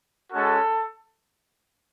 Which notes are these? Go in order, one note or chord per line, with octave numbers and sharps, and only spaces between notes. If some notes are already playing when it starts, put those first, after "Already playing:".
G#3 C#4 F#4 A4